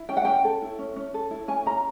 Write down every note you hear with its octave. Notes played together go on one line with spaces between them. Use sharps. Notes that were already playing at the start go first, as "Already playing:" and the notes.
Already playing: E4
C#4 G5
F#5
C#4 G5
A4
E4
C#4
C#4
A4
E4
C#4 G#5
C#4 A#5